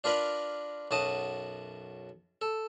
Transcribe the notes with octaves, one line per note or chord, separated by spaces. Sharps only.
D4 F4 A#4 B4 D5
B1 F#2 F#4 A5 D#6
A4